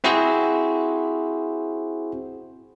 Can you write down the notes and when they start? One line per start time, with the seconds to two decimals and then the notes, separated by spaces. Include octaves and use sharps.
0.04 C4 E4 F#4 G#4 C5